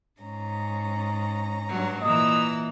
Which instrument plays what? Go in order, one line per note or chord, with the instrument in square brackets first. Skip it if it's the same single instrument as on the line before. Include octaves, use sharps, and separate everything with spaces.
[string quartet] G#2 C#4 A#5
[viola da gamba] G2 F#3
[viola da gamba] A#2 E3 [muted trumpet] D#5 [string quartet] A#5 E6